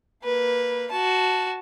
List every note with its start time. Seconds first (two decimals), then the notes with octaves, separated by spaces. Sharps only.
0.24 A#3 B4
0.91 F#4 A5